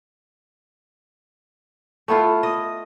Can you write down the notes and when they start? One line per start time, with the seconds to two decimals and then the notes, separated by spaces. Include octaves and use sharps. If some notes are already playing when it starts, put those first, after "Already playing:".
2.08 A3 B3 E4 F4
2.43 D#5